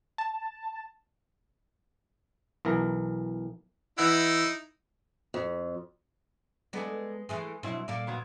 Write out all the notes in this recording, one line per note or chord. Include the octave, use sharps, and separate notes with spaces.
A5
B1 E3 A#4
E3 D#4 E4 E5 F#5
F2
G#3 B3 G#4 A4 D5
E3 G#3 A3 G#4
B2 F#3 C4 E4
A#2 A#3 A4 D5
F2 F#3 B3